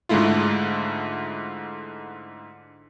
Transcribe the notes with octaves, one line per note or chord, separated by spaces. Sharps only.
G#2 D3 G#3 A3 E4 F4